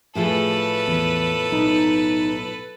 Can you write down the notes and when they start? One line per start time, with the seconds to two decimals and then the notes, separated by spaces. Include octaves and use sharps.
0.15 A2 F3 G#4 A4 B4
0.88 E2
1.52 B1 D#4